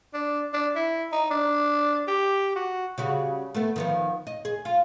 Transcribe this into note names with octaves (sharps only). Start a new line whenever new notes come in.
D4
D4
E4
D#4
D4
G4
F#4
C#3 G3 F#4
A3 B3
D#3 F3 B3
D#5
G#4
F4